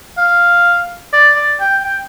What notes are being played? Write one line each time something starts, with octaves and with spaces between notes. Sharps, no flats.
F5
D5
D5
G5
G5